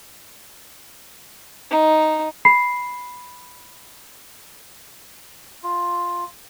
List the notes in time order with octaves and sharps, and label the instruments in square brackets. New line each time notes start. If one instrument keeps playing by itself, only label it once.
[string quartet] D#4
[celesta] B5 C7
[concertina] F4